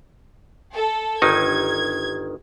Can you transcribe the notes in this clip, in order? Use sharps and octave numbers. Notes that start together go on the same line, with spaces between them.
A4
G1 D#3 D#4 G#6